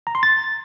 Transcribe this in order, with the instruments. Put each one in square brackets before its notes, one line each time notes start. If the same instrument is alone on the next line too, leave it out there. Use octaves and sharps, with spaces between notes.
[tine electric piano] A#5
C6
A6